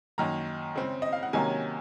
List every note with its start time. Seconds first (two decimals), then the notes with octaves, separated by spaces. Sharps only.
0.18 F#2 D#3 A#3 A#5
0.75 C#3 G#3 C4
1.02 D#5
1.13 F5
1.23 F#5
1.33 C3 D#3 F#3 A#3 C#4 G#5